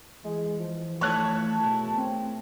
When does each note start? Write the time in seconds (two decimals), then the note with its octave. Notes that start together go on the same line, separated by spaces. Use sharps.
0.24 E3 G#3
0.59 F3
1.01 A3 D#4 F4 C#5 A5 F#6 G#6
1.64 B2 E4 G#4 A#4
1.98 A3 C4